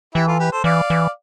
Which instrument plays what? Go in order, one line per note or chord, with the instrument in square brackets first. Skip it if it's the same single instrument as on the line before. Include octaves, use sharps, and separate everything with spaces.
[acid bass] E3 [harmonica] E4 G4
[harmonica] F4 A4
G4 B4
A4 C5
[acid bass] E3 [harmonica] D5 F5
[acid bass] E3